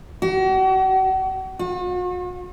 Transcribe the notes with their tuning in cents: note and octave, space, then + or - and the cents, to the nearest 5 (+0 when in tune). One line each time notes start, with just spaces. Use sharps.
F#4 +40
F#4 -45